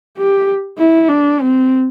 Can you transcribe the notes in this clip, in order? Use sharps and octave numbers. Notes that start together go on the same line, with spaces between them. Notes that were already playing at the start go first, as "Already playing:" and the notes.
G4
E4
D4
C4